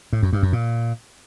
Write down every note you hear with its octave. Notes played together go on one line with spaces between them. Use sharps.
A2
F#2
G2
F#2
A#2